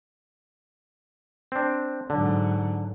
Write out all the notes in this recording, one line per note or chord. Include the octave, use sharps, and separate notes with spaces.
C4 D4
G#2 D3 F#3